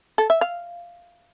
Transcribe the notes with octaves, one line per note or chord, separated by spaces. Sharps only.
A4
E5
F5